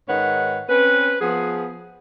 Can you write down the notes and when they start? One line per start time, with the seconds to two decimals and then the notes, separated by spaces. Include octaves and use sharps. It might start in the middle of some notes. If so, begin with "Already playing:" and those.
0.09 G#2 D#3 B4 C#5 F#5
0.68 C4 C#4 B4
1.20 F3 B3 G#4